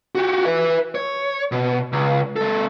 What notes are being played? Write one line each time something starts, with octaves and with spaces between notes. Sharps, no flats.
F#4 G4
B4 E5
C#5
B2
C#2
G#3 A4